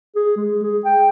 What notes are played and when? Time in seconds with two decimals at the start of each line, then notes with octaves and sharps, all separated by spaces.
0.16 G#4
0.36 G#3
0.63 G#4
0.85 G5